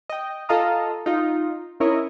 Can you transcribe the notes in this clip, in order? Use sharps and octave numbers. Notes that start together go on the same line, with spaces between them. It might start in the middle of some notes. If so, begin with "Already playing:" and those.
D#5 G5
F4 A4 D#5 F5 A#5 D#6
D#4 F4
C#4 E4 A#4 C#5 D#5